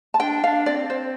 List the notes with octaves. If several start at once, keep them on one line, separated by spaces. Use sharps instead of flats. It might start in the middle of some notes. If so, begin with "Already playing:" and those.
A5
D4 G5
D4 F5
C4 D5
C5